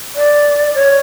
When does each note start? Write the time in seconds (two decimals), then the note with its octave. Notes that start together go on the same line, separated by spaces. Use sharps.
0.15 D5
0.75 C#5